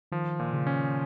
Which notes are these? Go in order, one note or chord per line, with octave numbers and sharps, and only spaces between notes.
D#3 F3
A#2
C#3
C#4